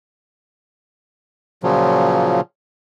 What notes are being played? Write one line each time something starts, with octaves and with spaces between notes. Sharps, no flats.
A#2 C#3 F3 F#3